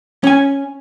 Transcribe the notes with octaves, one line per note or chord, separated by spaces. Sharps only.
C#4 G#5